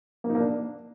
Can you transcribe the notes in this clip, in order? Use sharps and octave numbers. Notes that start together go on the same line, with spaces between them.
A#3
D#4
A#3
D4